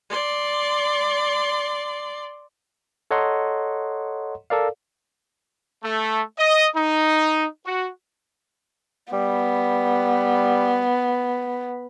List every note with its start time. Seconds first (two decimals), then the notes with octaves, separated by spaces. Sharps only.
0.10 D5 C6
3.11 A4 C#5 D#5 F#5 A#5 C6
4.50 A4 A#4 D5 F5
5.84 A3
6.38 D#5
6.76 D#4
7.65 F#4
9.13 G3 B3